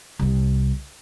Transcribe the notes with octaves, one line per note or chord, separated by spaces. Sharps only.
C2 C3